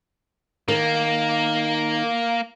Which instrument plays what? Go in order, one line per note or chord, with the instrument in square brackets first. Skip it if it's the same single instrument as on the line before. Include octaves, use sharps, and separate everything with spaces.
[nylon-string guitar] D#3 [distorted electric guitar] A#3